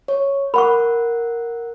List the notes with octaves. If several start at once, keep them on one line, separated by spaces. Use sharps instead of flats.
C#5
A#4 F#5 B5 C#6